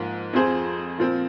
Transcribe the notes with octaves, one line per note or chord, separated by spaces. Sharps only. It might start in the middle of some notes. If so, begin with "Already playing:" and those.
Already playing: G#2 F3 A#3
F2 F3 C4 G#4 C5
A#2 F3 C4